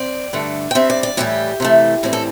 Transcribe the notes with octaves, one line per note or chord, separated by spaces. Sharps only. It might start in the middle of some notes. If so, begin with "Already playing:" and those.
Already playing: C4 D5
G2 D3 A3
G5
G2 G3 C4 E5
D5
D5
A2 E3 G3 G4
C3 E3 A3
A2 E3 G3 C4
A4